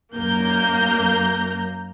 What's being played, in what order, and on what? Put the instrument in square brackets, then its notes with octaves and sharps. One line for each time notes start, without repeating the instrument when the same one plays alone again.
[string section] F#2 A#3 A#5 G6